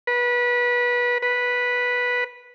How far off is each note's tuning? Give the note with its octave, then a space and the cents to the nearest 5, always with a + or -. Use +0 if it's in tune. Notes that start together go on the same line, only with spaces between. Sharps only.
B4 -25
B4 -10